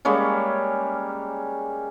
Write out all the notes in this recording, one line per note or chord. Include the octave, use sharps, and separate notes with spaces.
G3 G#3 A#3 C#4